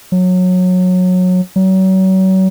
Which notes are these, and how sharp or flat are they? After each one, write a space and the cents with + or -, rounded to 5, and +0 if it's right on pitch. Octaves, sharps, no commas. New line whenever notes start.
F#3 -20
F#3 +35